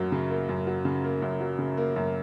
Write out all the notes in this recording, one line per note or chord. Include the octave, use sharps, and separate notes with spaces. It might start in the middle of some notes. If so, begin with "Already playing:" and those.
Already playing: F#2 F#3 A#3
C#3
A#3
F#2
F#3
C#3
A#3
F#2
F#3
C#3
A#3
F#2